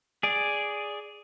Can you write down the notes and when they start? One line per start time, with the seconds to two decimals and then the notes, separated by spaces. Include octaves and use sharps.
0.23 G#4 D5